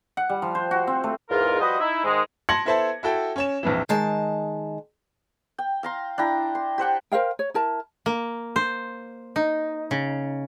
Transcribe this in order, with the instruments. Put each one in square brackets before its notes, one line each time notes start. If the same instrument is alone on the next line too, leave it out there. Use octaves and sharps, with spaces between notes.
[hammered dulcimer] F#5
G3
F3
C5
F#4
C4
A3
[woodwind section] E2 G#2 F4 A#4
F3 G3 F#4 B4 C5 D#5
D#4 E4
G#2 D#3 G#3
[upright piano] A5 C6 G#6 A#6 C#7 F#7
B3 E4 A4 C5 E5 A5
E4 F#4 A4 G5
C#4 C#5 E7
A#1 F2 E3
[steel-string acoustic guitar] D#3 G#3 A5
[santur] G5
F5 A#5 C6
D4 E4 G5 A#5
C6
G4 C5 F#5 G5
[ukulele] A#4 C5 F5 G5
C#5
E4 A#4 A5
[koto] A#3
C5
D#4
C#3